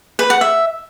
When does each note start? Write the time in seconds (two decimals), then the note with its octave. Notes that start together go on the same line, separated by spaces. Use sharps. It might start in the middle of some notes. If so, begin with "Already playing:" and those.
0.19 B4
0.30 F#5
0.41 E5